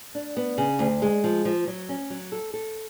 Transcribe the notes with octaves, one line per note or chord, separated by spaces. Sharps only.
D4
B3
C#3
D2
G#3
F3
F3
F#3
C#4
F#3
A4
A4